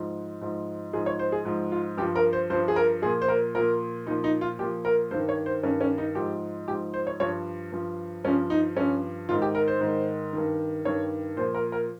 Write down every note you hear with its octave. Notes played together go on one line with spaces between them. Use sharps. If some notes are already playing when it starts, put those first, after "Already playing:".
Already playing: G#2 F3
G#2 F3
G#2 F3 G#4
C#5
C5
G#4
G#2 F3
F4
G2 F3 G4
A#4
C5
G2 F3 C5
G#4
A#4
A#2 F3 G#4
C5
A#4
A#2 F3 A#4
A#2 F3 D#4
D#4
F4
A#2 F3 G4
A#4
G2 D#3 C5
C#5
C5
G2 D#3 C#4
C#4
D#4
G#2 F3 G4
G#2 F3 G4
C5
C#5
G2 F3 C#5
G2 F3
G2 F3 C#4
D#4
G2 F3 C#4
G#2 D#3 F4
G4
A#4
C5
G#2 D#3
G2 D#3
G2 D#3 C#5
A#2 F3 C5
A#4
A#4